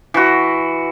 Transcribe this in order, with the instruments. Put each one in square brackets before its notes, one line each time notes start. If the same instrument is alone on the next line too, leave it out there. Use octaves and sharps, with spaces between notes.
[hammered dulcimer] E3 F#4